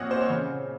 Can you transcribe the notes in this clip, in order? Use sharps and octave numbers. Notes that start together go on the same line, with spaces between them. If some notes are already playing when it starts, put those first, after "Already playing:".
Already playing: A#2 F3 C4 C#5 D#5 F#5
C5
C#5
C#3